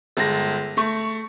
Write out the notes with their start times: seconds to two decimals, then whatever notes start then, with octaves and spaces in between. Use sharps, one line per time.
0.17 G1 G#3 A#6
0.77 A3 C#6